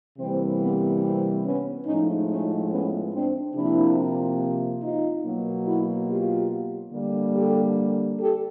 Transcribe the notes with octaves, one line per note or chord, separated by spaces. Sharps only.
C3 E3 G3 A#3 C4
B3
C4
B3 C#4
A2 F3 G#3 C#4 D#4
C#4 D#4
B3 C#4
C4 D4
C3 F3 A#3 D4 E4
D#4 F4
B2 F#3 A#3
E4 F#4
F4 G4
D3 G3 A#3
G4 A4
G4 A4